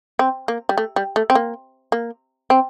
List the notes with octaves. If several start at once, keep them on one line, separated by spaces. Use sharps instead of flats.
C4
A#3
G3
A3
G3
A3
C4
A#3
A#3
C4